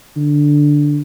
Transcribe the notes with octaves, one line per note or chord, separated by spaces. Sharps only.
D3